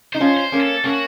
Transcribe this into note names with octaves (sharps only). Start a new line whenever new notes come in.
D#4 C5
C#4 F4
C5
A#3 C#4
A4
A#3 C#4 F#4